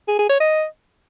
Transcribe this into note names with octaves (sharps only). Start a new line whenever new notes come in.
G#4
G#4
C#5
D#5